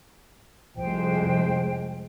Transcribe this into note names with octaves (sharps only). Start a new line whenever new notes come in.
C2 F2 G#3 C5 G5